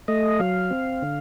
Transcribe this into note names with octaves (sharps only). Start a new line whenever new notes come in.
A3 D#5
F#3 F5
C4
D3